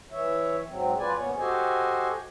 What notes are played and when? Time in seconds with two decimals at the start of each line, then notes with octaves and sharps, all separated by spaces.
0.12 E3 C#5 E5
0.68 G#2 F#3 C4
0.98 F2 C#4 F4 B4 D5 G#5
1.17 D#2 G#2 B3 C#4 C#5
1.38 F#4 G4 A4 C5 D#5 G#5